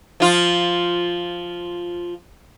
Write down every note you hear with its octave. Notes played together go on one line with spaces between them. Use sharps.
F3 F4